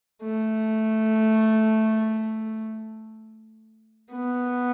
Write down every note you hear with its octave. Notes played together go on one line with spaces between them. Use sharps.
A3
B3